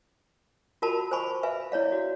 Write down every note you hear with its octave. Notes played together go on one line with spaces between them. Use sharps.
F4 F#4 A#4 A5 B5
C5 G#5 B5 C#6
B4 E5 F5 G#5
E4 C#5 D5 F5
F#4